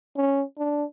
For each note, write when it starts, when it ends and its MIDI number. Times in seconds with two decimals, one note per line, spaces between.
0.16 0.43 61
0.58 0.84 62